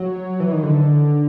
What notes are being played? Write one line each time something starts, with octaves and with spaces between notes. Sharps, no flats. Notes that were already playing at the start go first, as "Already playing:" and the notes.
Already playing: F#3
E3
D#3
D3